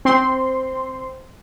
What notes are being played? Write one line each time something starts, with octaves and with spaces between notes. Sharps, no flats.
C4 C6